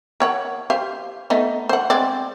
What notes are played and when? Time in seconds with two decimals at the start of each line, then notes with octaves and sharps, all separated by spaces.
0.20 A#4 C#5 F#5
0.70 G4 C5 F5
1.30 A3 B3 D#4
1.69 C5 F#5
1.90 G#3 C4 D5